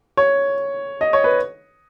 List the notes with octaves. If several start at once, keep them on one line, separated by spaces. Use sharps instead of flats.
C#5
D#5
C#5
B4